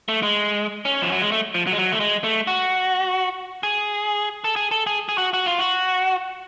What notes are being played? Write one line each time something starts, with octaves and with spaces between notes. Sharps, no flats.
A3
G#3
C#4
F3
F#3
G#3
A3
F3
F#3
G#3
F#3
A3
G#3
A3
F#4
G#4
A4
G#4
A4
G#4
G#4
F#4
F#4
F4
F#4